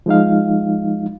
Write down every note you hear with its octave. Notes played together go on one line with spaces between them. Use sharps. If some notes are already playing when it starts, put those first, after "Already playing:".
F3 G#3 D#4 F5